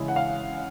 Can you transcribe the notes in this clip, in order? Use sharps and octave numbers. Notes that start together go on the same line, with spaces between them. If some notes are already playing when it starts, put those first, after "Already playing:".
Already playing: C#3 E3 G#3 C#4 E4
F#5
F5